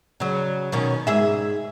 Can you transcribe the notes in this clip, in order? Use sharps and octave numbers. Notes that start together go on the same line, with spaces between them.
C#3 F#3
B2 D#3 C#4
G#2 G#4 E5